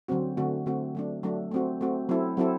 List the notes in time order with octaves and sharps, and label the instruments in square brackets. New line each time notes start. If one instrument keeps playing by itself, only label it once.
[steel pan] D3 F#3 C4 F#4
D3 A3 C4 F#4
D3 A3 C4 F#4
F#3 A3 D4
F#3 A3 D4
A3 C4 F#4
A3 C4 F#4
F#3 C4 E4 A4
F#3 C4 E4 A4